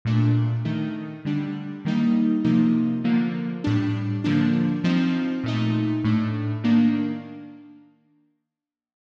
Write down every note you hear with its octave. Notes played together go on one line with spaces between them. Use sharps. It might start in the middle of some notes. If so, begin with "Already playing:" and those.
A#2 A3 D4
D#3 A3 D#4
D3 G3 D4
D#3 G3 A#3 D#4
C3 F3 A#3 D#4
D3 F3 A#3
A2 G3 D4
D3 F3 A#3 D4
F3 C4 D#4
A#2 A3 D#4
A2 A3 D4
D#3 A#3 D4